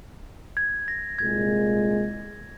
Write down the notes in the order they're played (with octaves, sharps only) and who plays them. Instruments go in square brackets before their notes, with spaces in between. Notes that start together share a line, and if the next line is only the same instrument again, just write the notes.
[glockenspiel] G#6
A#6
[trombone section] C2 A#2 G#3 [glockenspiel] G#6